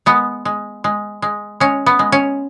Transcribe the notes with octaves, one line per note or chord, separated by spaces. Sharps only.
G#3 B3
G#3
G#3
G#3
G#3 C#4
B3
G#3
C#4